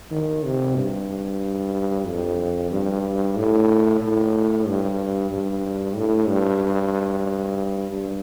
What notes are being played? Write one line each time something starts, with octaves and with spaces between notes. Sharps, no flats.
D#3
C3
G2
F2
G2
A2
A2
G2
G2
A2
G2
G2